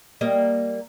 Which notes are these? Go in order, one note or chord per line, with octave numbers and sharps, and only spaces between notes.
G3 A#3 D#5